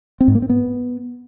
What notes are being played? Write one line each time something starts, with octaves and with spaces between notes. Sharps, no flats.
C4
G#2
A#3
C4
B3